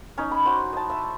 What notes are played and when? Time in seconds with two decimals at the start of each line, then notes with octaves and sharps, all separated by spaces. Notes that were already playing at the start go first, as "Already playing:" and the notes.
0.18 C#4 D#4 D#5
0.32 B5
0.45 F#4 C5
0.73 D#5 A5
0.90 E5